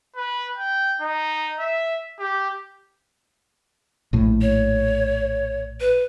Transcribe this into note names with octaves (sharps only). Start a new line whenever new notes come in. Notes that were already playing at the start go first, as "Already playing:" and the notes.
B4
G5
D#4
E5
G4
A#1 A2
C#5
B4